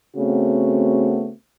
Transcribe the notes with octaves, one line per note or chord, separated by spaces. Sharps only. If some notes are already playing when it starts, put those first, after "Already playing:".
C#3 A3 B3 C4 F#4